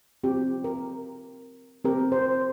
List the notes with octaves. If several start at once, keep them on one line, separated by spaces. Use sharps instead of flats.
C4 F4 G4
A#4
C4 G4 A#4
C5